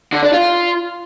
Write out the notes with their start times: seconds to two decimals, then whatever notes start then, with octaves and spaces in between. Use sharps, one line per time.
0.13 D3
0.23 D4
0.33 F4